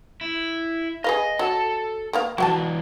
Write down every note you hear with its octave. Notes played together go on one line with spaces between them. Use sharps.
E4
G#4 B4 D#5 F5
F#3 A4 A5
A#3 B3 F5
E3 F#3 F#4 F#5 A5